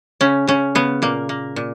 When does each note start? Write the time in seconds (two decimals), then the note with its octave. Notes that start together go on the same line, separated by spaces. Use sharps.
0.21 C#3 C#4
0.47 C#3 C#4
0.75 C#3 B3
1.02 A#2 A#3
1.29 A#3
1.56 A#2